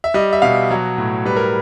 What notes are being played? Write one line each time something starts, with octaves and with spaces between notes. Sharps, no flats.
E5
G3 D#5
E5
B2 F5
F#3
A2
G3 B4
A#4